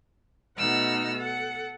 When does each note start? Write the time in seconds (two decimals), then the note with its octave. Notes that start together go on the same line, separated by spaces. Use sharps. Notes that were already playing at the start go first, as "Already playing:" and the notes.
0.57 B2 A3 D#4 F#5 E6 F6
1.16 A4 F#5